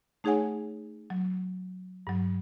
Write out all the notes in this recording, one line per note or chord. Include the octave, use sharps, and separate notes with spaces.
A3 D#4 G#4 C#5 F#5 G#5
F#3
G2 F#3